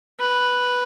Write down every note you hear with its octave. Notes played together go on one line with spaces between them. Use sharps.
B4